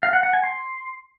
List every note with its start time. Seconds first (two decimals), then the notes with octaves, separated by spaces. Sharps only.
0.03 F5
0.13 F#5
0.23 F#5
0.33 G#5
0.44 C6